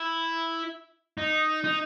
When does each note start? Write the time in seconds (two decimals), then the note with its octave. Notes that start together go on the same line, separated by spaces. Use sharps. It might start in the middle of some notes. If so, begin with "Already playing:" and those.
Already playing: E4
1.18 D#4
1.64 D#4